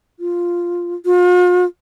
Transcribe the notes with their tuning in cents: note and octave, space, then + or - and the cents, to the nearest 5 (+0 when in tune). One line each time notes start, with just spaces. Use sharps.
F4 +0
F4 +40